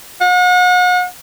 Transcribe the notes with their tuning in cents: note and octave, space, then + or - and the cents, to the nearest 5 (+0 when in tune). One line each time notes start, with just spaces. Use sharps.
F#5 -40